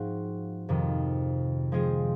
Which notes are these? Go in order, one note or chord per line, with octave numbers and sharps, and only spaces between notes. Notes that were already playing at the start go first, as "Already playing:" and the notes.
Already playing: G#2 F3 C4 F#4
F2 C3 D#3
F3 G#3 C4 F4 G#4